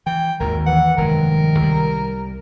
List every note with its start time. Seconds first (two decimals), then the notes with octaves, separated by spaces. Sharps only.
0.06 E3 G5
0.40 G#1 D#2 G#2 A#4
0.66 E3 F#5
0.98 F1 G2 D#3 G#3 A#4
1.59 C2 G3